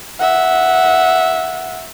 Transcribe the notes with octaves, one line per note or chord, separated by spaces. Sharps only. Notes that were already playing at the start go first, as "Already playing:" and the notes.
E5 F#5